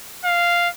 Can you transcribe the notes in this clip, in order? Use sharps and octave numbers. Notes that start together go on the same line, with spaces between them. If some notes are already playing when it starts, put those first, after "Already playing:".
F5